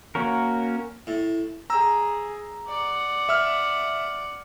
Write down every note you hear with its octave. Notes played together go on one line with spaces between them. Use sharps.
A#3 C#4 F#4 A#4
A2
G#4 A#5 E6
D5 F#5
E5 E6 F6